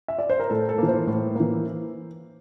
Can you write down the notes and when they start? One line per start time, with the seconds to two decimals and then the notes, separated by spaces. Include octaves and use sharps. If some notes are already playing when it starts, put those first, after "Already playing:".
0.08 E5
0.18 D5
0.30 C5
0.40 A#4
0.50 A2 A4
0.69 A4
0.78 E3 A#3
0.88 C5
1.07 A2
1.35 E3 A#3